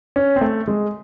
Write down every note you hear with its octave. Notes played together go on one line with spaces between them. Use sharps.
C#4
C4
A3
G#3